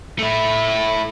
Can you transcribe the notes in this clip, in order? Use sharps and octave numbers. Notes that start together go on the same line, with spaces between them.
A3 E4